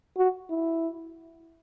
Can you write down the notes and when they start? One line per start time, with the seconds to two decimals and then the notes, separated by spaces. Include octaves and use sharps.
0.17 F#4
0.50 E4